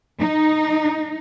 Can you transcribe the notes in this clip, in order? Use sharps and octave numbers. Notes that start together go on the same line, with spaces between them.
D#4